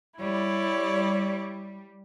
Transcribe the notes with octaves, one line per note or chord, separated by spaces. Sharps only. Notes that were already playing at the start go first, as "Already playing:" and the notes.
G3 E4 C#5 D5